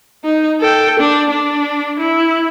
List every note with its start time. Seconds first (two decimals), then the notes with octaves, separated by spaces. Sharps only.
0.24 D#4
0.61 A4 G5
0.99 D4
1.31 D4
2.00 E4